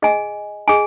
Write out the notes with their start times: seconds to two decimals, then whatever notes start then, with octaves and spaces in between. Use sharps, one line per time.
0.02 G#4 D#5 G#5
0.68 G#4 D#5 G#5